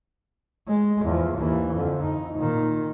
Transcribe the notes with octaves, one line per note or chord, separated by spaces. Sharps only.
G#3
E2 F3
D#2 E3
F2 D3
D#4
A#2 D#3